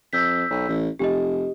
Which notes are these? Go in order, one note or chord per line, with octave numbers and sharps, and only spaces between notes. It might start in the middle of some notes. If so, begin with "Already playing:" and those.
F2 E6 G6 B6
B1
A1
F1 G4 D#5